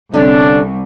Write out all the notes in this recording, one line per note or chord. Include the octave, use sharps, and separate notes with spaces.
C2 D3 C#4 D4 G4